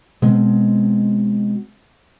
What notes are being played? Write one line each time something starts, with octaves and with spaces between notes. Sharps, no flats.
B2 G#3 C4